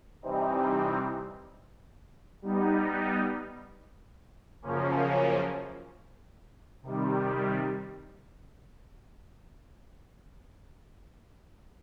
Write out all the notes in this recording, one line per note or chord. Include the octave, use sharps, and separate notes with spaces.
C3 E3 G3 C4 D#4
G3 B3 D#4
F#2 C#3 F3 A#3 C#4
C3 D#3 G3